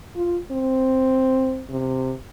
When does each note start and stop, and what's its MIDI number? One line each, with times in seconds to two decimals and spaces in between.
0.16 0.38 65
0.51 1.63 60
1.70 2.14 48